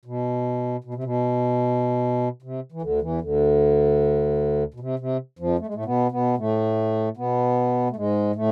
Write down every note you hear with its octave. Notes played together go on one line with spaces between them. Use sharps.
B2
B2
C3
B2
C3
E3
D2 D3
E2 E3
D2 D3
B2
C3
C3
F2 F3
A3
G#3
A2 A3
B2 B3
B2 B3
A2 A3
B2 B3
A3
G#2 G#3
A2 A3